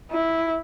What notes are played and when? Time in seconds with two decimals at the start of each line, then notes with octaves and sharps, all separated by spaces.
0.11 E4